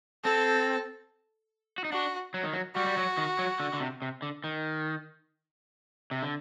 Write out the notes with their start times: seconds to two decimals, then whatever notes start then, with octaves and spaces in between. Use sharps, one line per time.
0.24 C4 A4
1.78 F#4
1.85 D#4
1.92 D4 F#4
2.34 F#3
2.43 D#3
2.53 F#3
2.75 G3 F#4
2.87 G3
2.97 F#3
3.18 D#3
3.39 F#3
3.60 D3
3.73 D3
3.80 C3
4.02 C3
4.22 D3
4.44 D#3
6.11 C3
6.22 D3